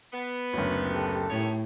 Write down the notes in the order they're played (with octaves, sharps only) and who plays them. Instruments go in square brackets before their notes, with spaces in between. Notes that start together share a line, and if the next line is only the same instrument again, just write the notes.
[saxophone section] B3
[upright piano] F#1 D2 [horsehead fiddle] C#5
[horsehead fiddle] G4 A4
[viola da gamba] A2 [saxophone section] D#3 B3 C#5